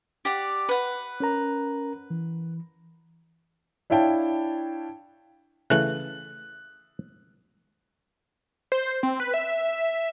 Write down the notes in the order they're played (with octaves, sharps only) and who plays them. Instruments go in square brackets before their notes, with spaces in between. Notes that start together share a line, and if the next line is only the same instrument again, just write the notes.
[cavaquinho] G4 D5 F#5
B4 F#5
[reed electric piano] C#4 A#4 A#5
E3
[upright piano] D4 E4 C#5 F5 G5 A5
[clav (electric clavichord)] C#3 E3 A3 [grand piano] F#6
[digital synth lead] C5
C4
B4
E5